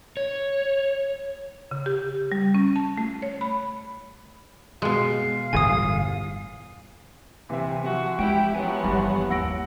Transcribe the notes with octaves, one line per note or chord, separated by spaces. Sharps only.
C#5
C#3
G4
G3
C#4
A5
A3
C#5
B5
B2 G#3 F5
G1 E2 A2 G#5 D#6
C3 E3 E5
F3 F#4
G#3 E4 G4 G5
F3 F#3 B3 G#5
G1 G2 D#3 E3 G4 B5
D#2 F#3 F#5 E6 A#6 D7